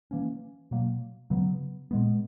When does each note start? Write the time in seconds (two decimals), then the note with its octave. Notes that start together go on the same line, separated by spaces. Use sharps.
0.11 E3 A#3 C#4
0.71 B2 F#3 A#3
1.30 C#3 F#3 B3
1.91 A#2 G#3 B3